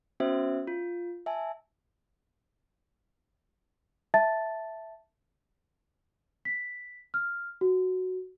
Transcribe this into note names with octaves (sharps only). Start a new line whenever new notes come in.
B3 C#4 F#4 C5 E5
F4
E5 G#5 A5
E5 A5 A6
B6
F6
F#4